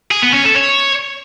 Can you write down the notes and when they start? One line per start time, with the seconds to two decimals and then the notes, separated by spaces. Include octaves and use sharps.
0.11 G#4
0.22 B3
0.33 C#4
0.45 A4
0.56 C#5